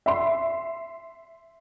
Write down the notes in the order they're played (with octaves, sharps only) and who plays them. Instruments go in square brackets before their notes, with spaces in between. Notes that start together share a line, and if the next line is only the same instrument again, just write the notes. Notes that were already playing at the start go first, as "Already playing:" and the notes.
[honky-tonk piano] E5 C6